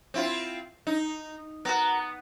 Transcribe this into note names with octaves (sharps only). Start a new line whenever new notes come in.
C4 E4 F4
D#4
B3 F#4 A#4